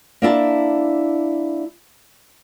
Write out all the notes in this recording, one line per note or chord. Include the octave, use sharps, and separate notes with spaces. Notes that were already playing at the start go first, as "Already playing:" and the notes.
A#3 D4 E4 A5